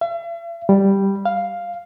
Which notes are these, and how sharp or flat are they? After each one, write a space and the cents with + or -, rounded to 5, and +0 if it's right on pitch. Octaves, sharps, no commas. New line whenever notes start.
E5 +45
G3 +0
F5 +0